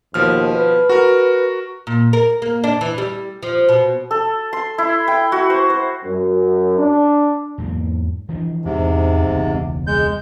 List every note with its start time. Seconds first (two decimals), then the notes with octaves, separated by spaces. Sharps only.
0.14 D#2 B2 F3 F6
0.54 B4
0.90 F#4 A#4
1.87 A#2
2.13 A#4
2.42 A#3
2.64 D4
2.81 E3
2.98 G3
3.43 F3
3.69 B2
4.11 A4
4.53 C6
4.78 E4
5.08 G5
5.32 F#4
5.50 C5
5.70 C5
6.05 F#2
6.78 D4
7.58 E2 G#2 A#3
8.29 E3 F3 D4
8.65 E2 G#2 C3
9.26 E1 C#2
9.87 G#3 G6